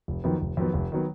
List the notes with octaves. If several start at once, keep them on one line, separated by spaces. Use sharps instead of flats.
F1
F2 D#3 F#3 B3
F1
F2 D#3 F#3 B3
F1
D#3 F#3 B3